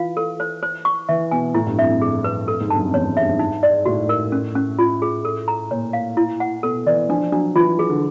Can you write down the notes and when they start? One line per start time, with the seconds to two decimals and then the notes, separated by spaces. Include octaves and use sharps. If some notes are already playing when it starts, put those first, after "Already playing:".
Already playing: E3 F4 F5
0.17 A4
0.40 C5
0.62 C5
0.85 C#6
1.09 E3 E5
1.31 B2 G#5
1.55 A2 E4
1.66 G2
1.78 F2 E5
1.89 F2
2.01 F2 G#4
2.24 B4
2.48 A4
2.60 G#2
2.68 G2 A5
2.76 F#2
2.85 F2
2.94 E2 C#5
3.05 F#2
3.17 G2 E5
3.28 G#2
3.39 D#4
3.63 D5
3.86 A2 F#4
4.09 A#4
4.32 C#4
4.55 C#4
4.79 F4
5.02 G#4
5.25 A4
5.48 A#5
5.71 A#2 C#5
5.93 F5
6.17 E4
6.40 F#5
6.63 B2 A4
6.86 E3 D5
7.09 F3 D4
7.32 F#3 D4
7.56 E3 F4
7.79 G#4
7.90 D3